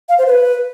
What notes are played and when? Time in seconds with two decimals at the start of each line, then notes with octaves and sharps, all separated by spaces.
0.09 F5
0.18 C5
0.27 B4